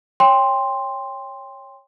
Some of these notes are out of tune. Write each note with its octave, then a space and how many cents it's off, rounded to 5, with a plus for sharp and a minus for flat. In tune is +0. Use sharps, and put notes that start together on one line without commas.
C#5 -5 G5 +25 C6 +0